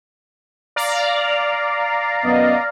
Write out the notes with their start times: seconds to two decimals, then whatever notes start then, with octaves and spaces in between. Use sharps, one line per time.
0.76 D5 F5 A#5
2.25 F#2 B3 D#5